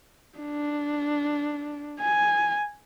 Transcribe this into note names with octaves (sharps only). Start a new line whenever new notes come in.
D4
G#5